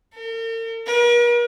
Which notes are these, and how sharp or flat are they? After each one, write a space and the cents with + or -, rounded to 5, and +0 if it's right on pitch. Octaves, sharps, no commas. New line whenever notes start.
A#4 -45
A#4 +45